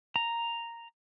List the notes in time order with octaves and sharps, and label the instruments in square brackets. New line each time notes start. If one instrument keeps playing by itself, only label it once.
[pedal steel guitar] A#5